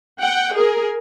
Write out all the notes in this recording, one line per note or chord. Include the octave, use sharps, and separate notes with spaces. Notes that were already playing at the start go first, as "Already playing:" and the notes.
F#5 G5
G#4 A#4